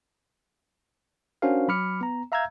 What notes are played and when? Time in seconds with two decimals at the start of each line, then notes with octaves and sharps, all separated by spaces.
1.42 C#4 D4 F#4 A#4 C5 F5
1.68 F#3 B5 D6 F6 C#7
2.01 B3 A#5
2.32 E5 F5 A#5 E6 G6 G#6